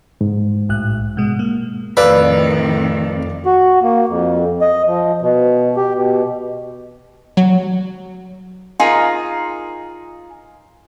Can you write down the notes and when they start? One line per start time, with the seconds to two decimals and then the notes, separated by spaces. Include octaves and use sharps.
0.21 G#2
0.69 B1 A2 F#6
1.17 B2 G#3
1.39 A#3
1.97 F2 A2 D#3 B4 D5 F5 E6
3.46 F#4
3.82 A#3
4.09 F2
4.61 D#5
4.87 F3
5.21 B2
5.76 G4
5.96 B2
7.37 F#3
8.80 D#4 F4 G#4 A#4